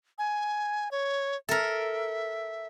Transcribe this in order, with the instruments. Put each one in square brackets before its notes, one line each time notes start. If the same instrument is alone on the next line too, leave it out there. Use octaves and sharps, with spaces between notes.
[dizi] G#5
C#5
[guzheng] A4 A#4 [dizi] E5